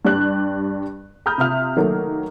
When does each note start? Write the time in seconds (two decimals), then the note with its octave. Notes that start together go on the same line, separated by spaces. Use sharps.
0.05 G2 G4 D5 F#6
1.26 A#5 B5 D#6 F6 G6
1.38 C3 F4 E5 F6
1.76 D#3 F#3 A3 A#3